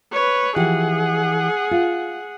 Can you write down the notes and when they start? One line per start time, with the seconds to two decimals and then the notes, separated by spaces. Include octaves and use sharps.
0.12 B4 C#5
0.56 E3 F3 G4 G#4 F#5
1.71 F4